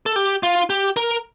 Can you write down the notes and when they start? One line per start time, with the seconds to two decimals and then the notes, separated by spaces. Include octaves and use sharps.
0.06 A4
0.16 G4
0.43 F4
0.70 G4
0.97 A#4